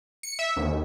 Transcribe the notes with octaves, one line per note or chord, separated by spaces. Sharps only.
C#7
E5
D#2